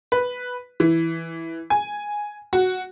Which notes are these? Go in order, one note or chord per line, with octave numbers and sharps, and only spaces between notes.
B4
E3
G#5
F#4